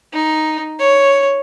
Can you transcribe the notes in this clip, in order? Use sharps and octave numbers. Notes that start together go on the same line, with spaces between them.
D#4
C#5